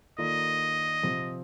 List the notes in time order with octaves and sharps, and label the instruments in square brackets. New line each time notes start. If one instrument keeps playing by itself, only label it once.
[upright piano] D#3 A#3 F4 A4 D5 [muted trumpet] D#5
[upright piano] C3 F3 C4 G4